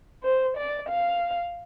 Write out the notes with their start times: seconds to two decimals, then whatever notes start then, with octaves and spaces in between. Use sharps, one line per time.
0.23 C5
0.57 D5
0.89 F5